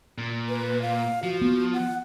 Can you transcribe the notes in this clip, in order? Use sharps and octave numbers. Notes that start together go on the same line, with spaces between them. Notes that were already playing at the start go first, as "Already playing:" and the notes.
A#2
B4
F5
F3 F#4
B3
F#5